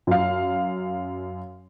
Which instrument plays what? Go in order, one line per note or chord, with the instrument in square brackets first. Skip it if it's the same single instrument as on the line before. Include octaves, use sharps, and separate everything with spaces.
[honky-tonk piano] F#2 F5